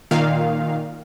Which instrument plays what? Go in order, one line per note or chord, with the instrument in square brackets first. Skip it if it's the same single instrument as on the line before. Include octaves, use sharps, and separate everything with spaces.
[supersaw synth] A#2 D#3 F5